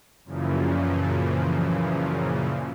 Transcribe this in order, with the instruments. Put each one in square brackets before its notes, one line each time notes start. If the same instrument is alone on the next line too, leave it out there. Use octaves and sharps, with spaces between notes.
[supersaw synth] F#2 A#2 C#3 E3 F3